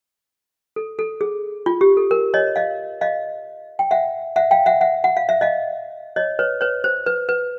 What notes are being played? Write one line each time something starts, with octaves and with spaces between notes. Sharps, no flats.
A4
A4
G#4
F4
G4
A4
A#4
C#5 D#5
D#5 F5
D#5 F5
G5
E5 F#5
E5 F#5
F5 G5
E5 F#5
E5 F#5
F#5
F5
E5
D#5 F5
C#5 D#5
B4 C#5
B4 C#5
C5
B4
B4